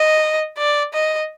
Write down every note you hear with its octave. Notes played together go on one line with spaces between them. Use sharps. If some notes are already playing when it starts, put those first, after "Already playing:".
Already playing: D#5
D5
D#5